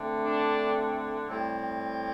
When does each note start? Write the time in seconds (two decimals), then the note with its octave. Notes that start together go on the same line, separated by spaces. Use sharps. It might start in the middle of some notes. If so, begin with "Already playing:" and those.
Already playing: D3 A3 C4
0.23 D4
1.27 A2 G3 C4